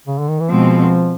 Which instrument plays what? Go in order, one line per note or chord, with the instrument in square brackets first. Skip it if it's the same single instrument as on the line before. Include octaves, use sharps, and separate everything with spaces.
[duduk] C#3
D3
D#3
E3
[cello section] B2 G#3 C4 [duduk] F3